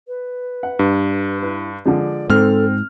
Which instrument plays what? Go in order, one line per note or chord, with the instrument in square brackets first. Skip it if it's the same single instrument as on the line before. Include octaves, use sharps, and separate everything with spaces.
[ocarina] B4
[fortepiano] F#5
[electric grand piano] G2
[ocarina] E4 [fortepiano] B4
[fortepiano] D3 F3 G#3 [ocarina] D5
[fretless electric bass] G#2 [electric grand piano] C4 F6 [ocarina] A4